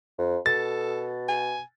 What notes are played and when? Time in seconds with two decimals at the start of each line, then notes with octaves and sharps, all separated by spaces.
0.19 F2
0.46 B2 A4 A6
1.29 G#5